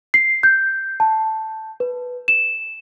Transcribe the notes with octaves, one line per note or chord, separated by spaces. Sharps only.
C7
G6
A5
B4
E7